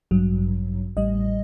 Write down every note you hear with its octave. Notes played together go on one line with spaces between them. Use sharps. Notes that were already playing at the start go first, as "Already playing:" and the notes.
A1 G2 F#3
A1 A2 G3 D#5